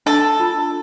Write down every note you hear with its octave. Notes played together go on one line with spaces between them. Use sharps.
D4 A4
F4